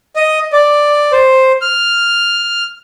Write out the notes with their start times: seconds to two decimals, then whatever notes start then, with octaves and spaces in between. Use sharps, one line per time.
0.16 D#5
0.52 D5
1.12 C5
1.61 F6